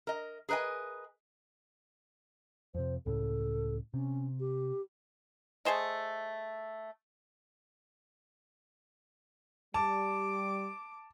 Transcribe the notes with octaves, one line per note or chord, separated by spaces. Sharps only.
A#4 D#5
G#4 A#4 B4 D#5 G#5
F2 C3 C5
C#2 A2 C#3 A4
C3 C#4
G4
A3 G#4 C5 D#5
G3 A5 D6